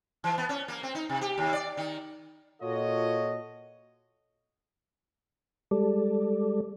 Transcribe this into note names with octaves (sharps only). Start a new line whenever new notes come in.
E3
B3
C#4
A#3
C4
D#4
C3
G4
D#2
D5
D#3
A#2 F4 F#4 A4 C#5 D#5
G3 G#3 A4 D5